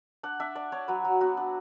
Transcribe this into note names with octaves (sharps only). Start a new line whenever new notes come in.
D4 F#5
D4 E5
D4 D5
D4 C#5
F#3 B4
F#3
B3 F#4
D4